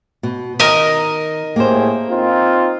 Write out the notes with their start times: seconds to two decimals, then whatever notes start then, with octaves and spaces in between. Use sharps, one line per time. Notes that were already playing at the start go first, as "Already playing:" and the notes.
0.23 B2
0.60 D#3 A#4 D#5
1.56 A2 A#3 G4 G#4 C5
2.09 C4 D#4 F4